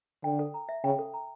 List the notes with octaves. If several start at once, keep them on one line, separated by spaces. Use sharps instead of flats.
D3 G5
A4
A#5
E5
C#3 G5
A4
A#5